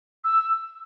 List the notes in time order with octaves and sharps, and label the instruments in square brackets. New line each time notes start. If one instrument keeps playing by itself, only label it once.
[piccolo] E6